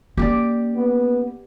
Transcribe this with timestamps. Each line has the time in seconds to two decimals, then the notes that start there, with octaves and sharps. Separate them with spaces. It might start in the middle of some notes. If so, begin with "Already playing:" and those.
0.17 A#3 C#4 G4 D5
0.76 B3